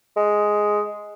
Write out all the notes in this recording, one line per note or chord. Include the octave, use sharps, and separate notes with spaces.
G#3